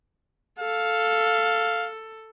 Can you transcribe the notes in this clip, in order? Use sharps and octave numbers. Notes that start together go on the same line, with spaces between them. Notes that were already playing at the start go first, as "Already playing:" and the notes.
A4 F5